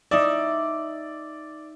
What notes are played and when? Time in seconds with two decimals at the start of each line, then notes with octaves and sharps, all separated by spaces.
0.11 D#4 D5 E5